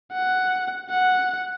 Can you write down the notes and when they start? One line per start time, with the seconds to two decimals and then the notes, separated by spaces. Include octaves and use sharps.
0.13 F#5
0.90 F#5